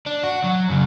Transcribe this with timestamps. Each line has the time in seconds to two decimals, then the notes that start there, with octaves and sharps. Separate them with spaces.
0.06 D4
0.23 F#4
0.44 F#3
0.70 F#2 C#3